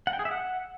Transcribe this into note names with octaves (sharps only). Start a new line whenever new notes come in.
F#5
G5
G#4
E5
F#5